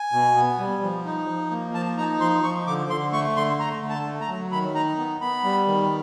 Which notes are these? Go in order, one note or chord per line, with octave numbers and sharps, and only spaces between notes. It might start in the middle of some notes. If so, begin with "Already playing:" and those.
Already playing: G#5
B2
B3
G3
F3
D#4
F3
A#3
F3 A5
D#4 A#5
F3 C6
F3 C#6
D3 D6
D3 C6
A3 C#6
D3 C6
A3 A#5
D3
A5
A3
A#5
F#3
D#3 B5
D#4 A#5
B3
B3 B5
G3
D#3